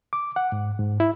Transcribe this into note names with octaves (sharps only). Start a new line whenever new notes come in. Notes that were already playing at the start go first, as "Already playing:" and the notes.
D6
F#5
G#2
G#2
E4